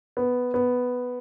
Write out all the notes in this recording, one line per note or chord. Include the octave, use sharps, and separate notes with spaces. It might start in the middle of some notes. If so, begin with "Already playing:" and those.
B3
B3